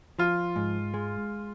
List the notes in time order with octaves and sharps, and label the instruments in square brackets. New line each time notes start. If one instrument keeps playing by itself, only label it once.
[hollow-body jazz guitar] F3 [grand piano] F4
[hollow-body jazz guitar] G#2
G#3